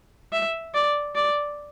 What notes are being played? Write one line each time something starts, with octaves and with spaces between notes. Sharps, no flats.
E5
D5
D5